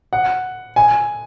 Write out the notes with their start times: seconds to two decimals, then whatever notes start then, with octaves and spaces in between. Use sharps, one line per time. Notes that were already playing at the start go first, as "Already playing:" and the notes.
0.13 F#5
0.76 G#5